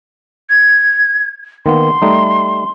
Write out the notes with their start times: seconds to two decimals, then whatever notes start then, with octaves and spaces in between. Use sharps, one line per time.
0.50 G#6
1.66 D#3 A#3 B3 C6
2.02 G3 A3 D#4